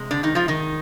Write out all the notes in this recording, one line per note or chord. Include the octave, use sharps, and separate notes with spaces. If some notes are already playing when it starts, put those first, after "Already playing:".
Already playing: C3 G#3
D3 D4
D#3 D#4
F3 F4
D#3 D#4